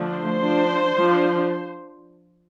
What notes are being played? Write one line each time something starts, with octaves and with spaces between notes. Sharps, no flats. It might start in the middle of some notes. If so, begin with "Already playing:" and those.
Already playing: D3 F3 A3 D4
C5
F3 D4
F3 D4